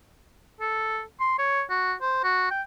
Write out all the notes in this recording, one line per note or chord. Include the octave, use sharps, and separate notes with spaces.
A4
C6
C#5
F#4
C5
F#4
G5